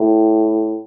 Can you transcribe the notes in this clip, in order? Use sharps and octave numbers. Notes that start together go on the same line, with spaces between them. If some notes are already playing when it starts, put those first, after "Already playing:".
Already playing: A2